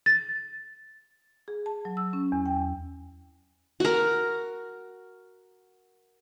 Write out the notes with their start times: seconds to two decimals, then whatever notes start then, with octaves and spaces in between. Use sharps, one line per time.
0.06 A6
1.48 G#4
1.66 A5
1.85 F#3
1.97 E6
2.13 C#4
2.32 E2
2.46 G5
3.80 F#4 A#4